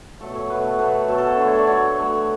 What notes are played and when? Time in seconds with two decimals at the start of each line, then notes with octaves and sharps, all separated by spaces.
0.21 B2 F#3 A3 A4
0.35 C#5
0.50 B2 F#3 A3 B4
0.64 A4
0.79 B2 F#3 A3 B4
1.08 B2 F#3 A3 A4
1.18 A4
1.27 C#5
1.37 D3 F#3 A3
1.47 C#5
1.57 D5
1.67 D3 F#3 A3 C#5
1.96 D3 F#3 A3 C#5